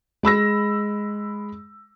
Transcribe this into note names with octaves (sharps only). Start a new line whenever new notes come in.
G#3 B5 E6 A#6